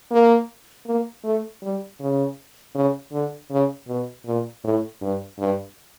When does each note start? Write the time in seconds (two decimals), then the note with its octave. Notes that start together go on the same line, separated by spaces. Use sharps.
0.11 A#3
0.86 A#3
1.24 A3
1.63 G3
2.00 C#3
2.75 C#3
3.12 D3
3.50 C#3
3.87 B2
4.26 A#2
4.64 A2
5.01 G2
5.39 G2